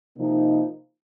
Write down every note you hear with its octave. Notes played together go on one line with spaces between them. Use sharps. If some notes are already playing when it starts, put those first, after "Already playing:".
C3 F3 A#3 D#4